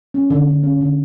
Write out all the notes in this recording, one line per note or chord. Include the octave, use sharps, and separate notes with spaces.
C#4
D3
D3
C#4
D3